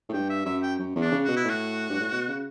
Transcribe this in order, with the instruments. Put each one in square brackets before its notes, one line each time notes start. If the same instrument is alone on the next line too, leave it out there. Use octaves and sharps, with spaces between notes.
[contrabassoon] A2
[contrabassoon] G2 [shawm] G5
[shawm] E5
[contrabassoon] F#2 [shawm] E5
[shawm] G5
[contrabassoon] F#2
E2
[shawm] D4
[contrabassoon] C#3
[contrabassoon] B2 [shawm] F#4
[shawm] E4
[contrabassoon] A2 [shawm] F#4
[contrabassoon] G2
A2
B2
C#3